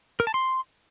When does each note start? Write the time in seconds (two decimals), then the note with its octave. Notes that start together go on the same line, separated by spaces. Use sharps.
0.20 A#4
0.27 A5
0.34 C6